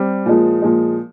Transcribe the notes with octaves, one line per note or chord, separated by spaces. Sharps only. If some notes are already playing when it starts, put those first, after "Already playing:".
Already playing: G3 C4 G4
A#2 F3 G#3
A#2 F3 G#3